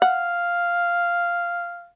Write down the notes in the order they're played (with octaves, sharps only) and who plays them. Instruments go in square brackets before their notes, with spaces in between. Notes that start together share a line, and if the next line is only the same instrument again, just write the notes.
[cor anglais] F5 [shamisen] F#5